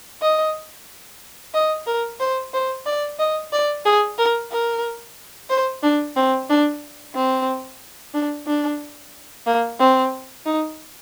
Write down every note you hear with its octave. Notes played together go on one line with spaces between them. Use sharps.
D#5
D#5
A#4
C5
C5
D5
D#5
D5
G#4
A#4
A#4
C5
D4
C4
D4
C4
D4
D4
A#3
C4
D#4